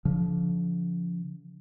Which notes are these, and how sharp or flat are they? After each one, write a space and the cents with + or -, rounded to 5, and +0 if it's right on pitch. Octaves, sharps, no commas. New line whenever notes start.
D3 -45 F3 +0